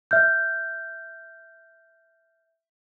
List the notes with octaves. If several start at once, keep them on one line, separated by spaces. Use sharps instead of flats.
E5 F6 G6